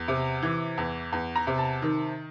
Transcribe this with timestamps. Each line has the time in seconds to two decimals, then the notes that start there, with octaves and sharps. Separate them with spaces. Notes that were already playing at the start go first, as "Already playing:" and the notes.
Already playing: E2
0.08 C3
0.43 E3
0.78 E2
1.12 E2
1.36 A#5
1.47 C3
1.58 A5
1.82 D#3